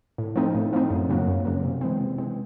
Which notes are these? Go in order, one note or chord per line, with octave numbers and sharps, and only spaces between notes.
A2
F3 A3 C4 D#4
A2
F3 A3 C4 D#4
F#2
C#3 F#3 A#3
F#2
C#3 F#3 A#3
C3
E3 G#3 C4
C3
E3 G#3 C4